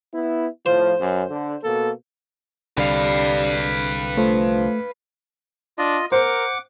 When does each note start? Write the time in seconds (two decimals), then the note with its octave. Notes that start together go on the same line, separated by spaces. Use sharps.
0.14 B3 E4
0.66 A2 F3 C5
1.01 F#2
1.30 D3
1.64 B2 A#3 A4
2.78 C2 D3 G3 B4 F5
4.17 F3 A3
5.78 D4 F4 D#5
6.12 A#4 C5 F#5 D6